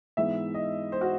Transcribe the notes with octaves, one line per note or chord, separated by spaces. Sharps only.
G#2 E3 G#3 B3 E5
D#5
C5
F#4